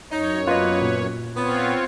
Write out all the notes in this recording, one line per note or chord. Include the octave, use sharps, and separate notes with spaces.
F#2 D#4 C#5
A#3 B3 F4 B4 D#5
A#2
B3 C4 F4 C#5